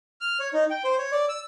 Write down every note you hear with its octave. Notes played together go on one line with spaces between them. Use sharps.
F6
C#5
D#4
G5
C5
C#5
D5
E6